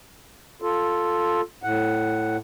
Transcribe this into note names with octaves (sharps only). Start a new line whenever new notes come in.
F4 A4
A2 F#5